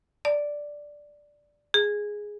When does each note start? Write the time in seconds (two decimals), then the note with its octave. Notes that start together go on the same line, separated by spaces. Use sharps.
0.25 D5
1.74 G#4